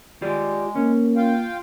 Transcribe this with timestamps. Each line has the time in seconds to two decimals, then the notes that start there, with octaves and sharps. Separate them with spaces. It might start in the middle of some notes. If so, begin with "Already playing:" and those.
0.22 G#3 F4 G4 D5
0.75 A#3 C#4
1.16 F4 F5 G5